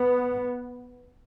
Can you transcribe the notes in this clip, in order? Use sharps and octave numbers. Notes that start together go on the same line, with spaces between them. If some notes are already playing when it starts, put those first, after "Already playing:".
Already playing: B3